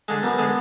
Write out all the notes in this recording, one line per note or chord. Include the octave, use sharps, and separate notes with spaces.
D3 G#3
F#2 B3
D3 G#3